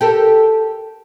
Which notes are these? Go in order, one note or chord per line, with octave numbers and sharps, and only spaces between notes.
G4 A4 A#4